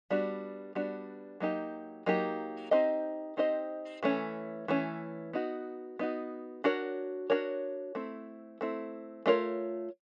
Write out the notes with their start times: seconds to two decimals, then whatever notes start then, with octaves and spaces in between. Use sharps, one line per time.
0.10 G3 B3 D4 F#4
0.75 G3 B3 D4 F#4
1.40 F#3 A#3 D#4 G4
2.06 F#3 A#3 D#4 G4
2.71 C4 D#4 G4 C5 D#5
3.37 C4 D#4 G4 C5 D#5
4.03 E3 A3 C#4
4.68 E3 A3 C#4
5.33 B3 D#4 F#4
5.99 B3 D#4 F#4
6.64 D4 F#4 A#4 C#5
7.30 D4 F#4 A#4 C#5
7.95 A3 C4 E4
8.61 A3 C4 E4
9.26 A3 D4 F4 A#4 C#5